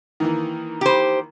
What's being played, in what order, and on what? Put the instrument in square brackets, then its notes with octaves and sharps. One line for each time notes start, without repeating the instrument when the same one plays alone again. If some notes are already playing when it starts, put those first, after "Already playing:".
[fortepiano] D#3 E3 A#3
[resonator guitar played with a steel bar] G4 C5